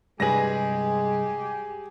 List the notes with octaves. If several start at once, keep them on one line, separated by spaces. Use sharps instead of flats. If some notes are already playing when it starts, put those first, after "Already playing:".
C2 G2 G#3 G4 G#4 B4 G#5 A#6